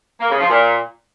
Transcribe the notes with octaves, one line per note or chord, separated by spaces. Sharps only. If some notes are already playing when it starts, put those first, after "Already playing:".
A#3
C#3
F3
A#2